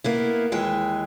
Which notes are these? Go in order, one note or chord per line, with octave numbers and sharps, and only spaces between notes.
A#3 B3 E4
D#2 E3 G#3 G5